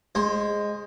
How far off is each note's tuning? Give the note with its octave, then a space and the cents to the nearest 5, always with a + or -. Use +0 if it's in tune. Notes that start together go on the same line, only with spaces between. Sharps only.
G#3 -5 C5 +25